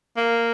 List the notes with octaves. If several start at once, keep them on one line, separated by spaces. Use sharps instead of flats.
A#3